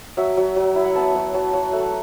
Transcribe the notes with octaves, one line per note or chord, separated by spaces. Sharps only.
F#3 E5
F#3
F#3
E4
F#5
B3 A5
F#3 F#5
F#3 A5
F#3 F#5
A3 F#5